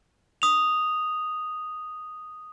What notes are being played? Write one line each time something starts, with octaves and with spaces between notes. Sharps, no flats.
D#6 F7